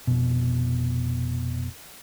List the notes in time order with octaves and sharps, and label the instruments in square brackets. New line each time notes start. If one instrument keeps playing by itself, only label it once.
[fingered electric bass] F1 B2